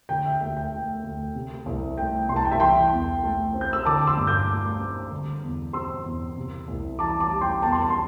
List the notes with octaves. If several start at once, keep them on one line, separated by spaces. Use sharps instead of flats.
D3 G5
E5
D2 G5
G5
A3
D2
C3
C2
A3 G5
C2 C6
A5
G5
E5 A5
E3 G5 C6
E2
A3
C4
G6
E6
D3 A5 D6
C6 E6
G2
D6 G6
A3
C4
D3
E2
C4 C6 E6
E2
C3
C2
E3 A5 D6
A5 D6
G3
G5 C6
E2 A5
C6
A5
C6